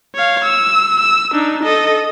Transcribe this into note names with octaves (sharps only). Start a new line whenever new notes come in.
C#5 F5
E6
E6
D4 D#4
A4 D#5